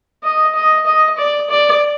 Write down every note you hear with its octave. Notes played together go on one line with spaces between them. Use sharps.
D#5
D#5
D#5
D5
D5